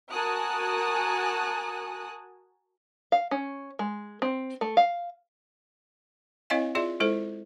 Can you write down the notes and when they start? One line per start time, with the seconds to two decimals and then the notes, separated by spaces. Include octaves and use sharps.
0.11 F#4 A#4 G#5 A5 D#6 F#6
3.12 F5
3.31 C#4
3.79 G#3
4.22 C4
4.61 A3
4.77 F5
6.50 C4 E4 C#5 D#5 F5 G#5
6.75 F4 G#4 D5 E5
7.00 G#3 E4 A4 C5